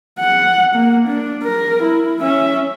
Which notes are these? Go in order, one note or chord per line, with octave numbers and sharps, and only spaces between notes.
F#5
A#3
D4
A#4
E4
C#4 E5